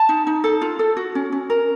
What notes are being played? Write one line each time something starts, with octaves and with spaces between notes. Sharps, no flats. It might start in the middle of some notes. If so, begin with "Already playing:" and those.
Already playing: A5
D#4
D#4
A4
F4
A4
F#4
C#4
C#4
A#4